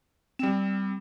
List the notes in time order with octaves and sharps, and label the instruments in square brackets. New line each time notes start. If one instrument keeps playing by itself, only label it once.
[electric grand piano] G3 E7 [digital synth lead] C4